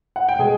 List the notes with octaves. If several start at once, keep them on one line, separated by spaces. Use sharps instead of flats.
F#5
G5
B2 G#3 B3 G#4 G#5